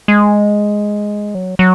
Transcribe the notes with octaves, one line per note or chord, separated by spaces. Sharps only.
G#3
F#3
F#3